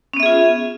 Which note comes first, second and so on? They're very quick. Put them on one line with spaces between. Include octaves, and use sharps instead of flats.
C#4 B3 E5 G#4 F4